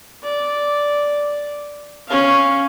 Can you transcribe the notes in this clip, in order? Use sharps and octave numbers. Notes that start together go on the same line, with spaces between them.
D5
C#4 F5